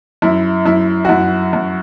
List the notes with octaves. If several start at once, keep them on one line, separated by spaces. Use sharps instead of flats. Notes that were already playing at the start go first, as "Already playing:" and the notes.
F#2 E4
F#2 E4
F#4
F#2 E4
F#2